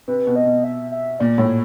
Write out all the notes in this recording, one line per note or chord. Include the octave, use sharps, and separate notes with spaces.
C3 B4
B2
D#5
B2
E5
E5
A#2 D5
A2 C#5